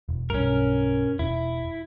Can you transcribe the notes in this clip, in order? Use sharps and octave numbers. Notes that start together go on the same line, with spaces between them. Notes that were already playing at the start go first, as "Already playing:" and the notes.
E1
B1 G2 C#4 A#4
E1 E4